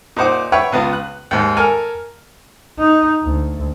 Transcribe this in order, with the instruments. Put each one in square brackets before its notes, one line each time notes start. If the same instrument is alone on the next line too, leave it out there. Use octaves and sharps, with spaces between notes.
[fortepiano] A#2 D#4 C5 F#5 D6
B4 C#5 E5 F#5 G5
C#2 B3 F4
F#6
D#2 G#2
A4 A#4 G#5 F6
[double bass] D#4
D2